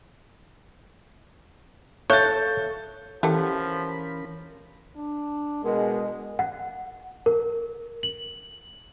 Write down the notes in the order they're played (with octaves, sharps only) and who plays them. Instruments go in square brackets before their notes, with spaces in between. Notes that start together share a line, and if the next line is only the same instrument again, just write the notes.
[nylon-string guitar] A4 [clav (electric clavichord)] C#5 [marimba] E5 F5 F#6 [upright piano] G6 A6
[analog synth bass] E3 [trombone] F3 [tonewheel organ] C#4 A#4 B5 [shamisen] G4 A4 F#5
[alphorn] D4
[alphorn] B2 [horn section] G#3 [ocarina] A#4
[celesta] F#5
A#4
F#7